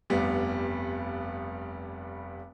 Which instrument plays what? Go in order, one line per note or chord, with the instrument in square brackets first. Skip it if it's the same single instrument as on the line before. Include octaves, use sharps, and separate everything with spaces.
[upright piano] F1 G2 G3 B3